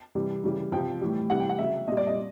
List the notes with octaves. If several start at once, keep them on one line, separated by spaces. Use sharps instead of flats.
C3 E3 G3
C#3 E3 G3
C3 F3 G5
A2 E3 G3
C3 E3 G3 F#5
G5
F#5
C#3 F#3 E5
A#2 G3 D#5
D5
D#5